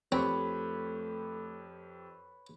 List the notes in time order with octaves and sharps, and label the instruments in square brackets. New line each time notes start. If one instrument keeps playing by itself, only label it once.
[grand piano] F2 G4 [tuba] A3 [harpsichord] C4 [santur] B4 C#5